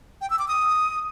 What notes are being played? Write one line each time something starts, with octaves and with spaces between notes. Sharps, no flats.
G5
E6
D6
D#6